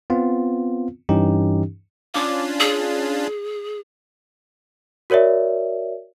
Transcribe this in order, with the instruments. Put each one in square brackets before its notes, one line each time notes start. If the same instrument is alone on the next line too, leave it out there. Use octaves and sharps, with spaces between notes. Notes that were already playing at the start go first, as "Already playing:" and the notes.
[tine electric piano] B3 C4 F4
G2 E3 C#4 D#4 G4
[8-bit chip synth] C#4 D4 F4 [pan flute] D6
[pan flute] G#4
[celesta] F#4 A#4 C#5 D5 E5